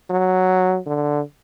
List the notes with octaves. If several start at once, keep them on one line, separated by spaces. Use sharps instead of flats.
F#3
D3